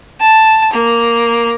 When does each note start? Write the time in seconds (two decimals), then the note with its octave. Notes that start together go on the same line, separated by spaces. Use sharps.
0.21 A5
0.73 A#3